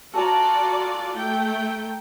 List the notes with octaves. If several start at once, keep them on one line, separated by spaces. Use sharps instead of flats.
F4 F#4 A4 D5 G#5 A#5
A3 G5